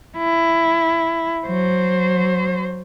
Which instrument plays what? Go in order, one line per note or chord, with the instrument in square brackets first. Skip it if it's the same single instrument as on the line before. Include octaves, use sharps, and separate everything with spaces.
[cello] E4
F#3 C5